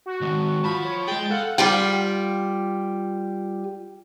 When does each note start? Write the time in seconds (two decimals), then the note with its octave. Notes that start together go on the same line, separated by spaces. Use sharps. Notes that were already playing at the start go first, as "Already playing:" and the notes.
0.06 F#4
0.21 D#3 G#3
0.64 F4 A5 B5
0.85 C#5
1.07 G#3 G#4 G5 A6
1.31 A4 F5 F#5
1.58 G3 F4 G5